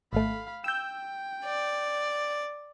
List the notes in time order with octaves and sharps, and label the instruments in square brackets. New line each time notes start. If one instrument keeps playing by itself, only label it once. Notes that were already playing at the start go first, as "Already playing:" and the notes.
[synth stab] G#1 A3 [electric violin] F5 B5
[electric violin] G5 [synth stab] E6 G6
[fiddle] D5